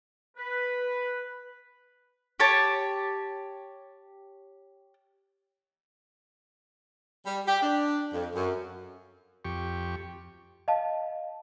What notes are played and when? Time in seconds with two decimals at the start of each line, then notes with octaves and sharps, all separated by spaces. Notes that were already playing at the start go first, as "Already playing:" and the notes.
0.36 B4
2.40 G4 C#5 A5
7.25 G3
7.47 G4
7.62 D4
8.13 F2
8.34 F#2
9.45 F2 G4 C#6
10.68 D#5 F5 A5